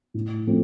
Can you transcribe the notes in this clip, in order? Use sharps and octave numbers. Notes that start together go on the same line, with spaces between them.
A2
F3 A3 C4